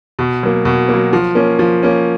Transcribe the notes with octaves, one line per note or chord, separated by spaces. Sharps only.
B2
F#3 A#3
B2
A#3
F#3
F3
A#3 C#4
F3
A#3 C#4